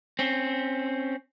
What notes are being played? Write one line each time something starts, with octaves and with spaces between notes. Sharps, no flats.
C4 C#4